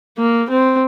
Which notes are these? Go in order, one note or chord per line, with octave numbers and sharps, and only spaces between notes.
A#3
C4